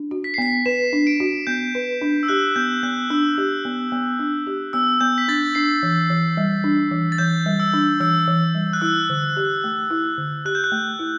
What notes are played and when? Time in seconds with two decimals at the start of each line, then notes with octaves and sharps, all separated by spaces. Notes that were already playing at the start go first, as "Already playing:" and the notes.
Already playing: D4
0.11 F#4
0.24 B6
0.34 C7
0.38 B3 B6
0.66 B4 E7
0.93 D4
1.07 D7
1.20 F#4
1.47 B3 G6
1.75 B4
2.01 D4
2.23 E6
2.28 G4 F#6
2.56 B3 G6
2.83 B3 F#6
3.10 D4 E6
3.38 G4
3.65 B3
3.92 B3
4.19 D4
4.47 G4
4.73 B3 E6
5.01 B3 G6
5.18 B6
5.28 D4 A6
5.55 D4 C7
5.83 E3
6.10 E3
6.37 G3
6.64 D4
6.91 E3
7.12 A6
7.18 E3 G6
7.46 G3
7.60 E6
7.74 D4
8.00 E3 E6
8.27 E3
8.55 G3
8.73 F#6
8.81 E4 E6
9.10 D3
9.36 G4
9.64 A3
9.91 E4
10.18 D3
10.45 G4 F#6
10.55 G6
10.64 F#6
10.72 A3
10.99 E4